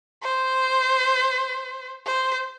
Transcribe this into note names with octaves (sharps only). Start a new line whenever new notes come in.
C5
C5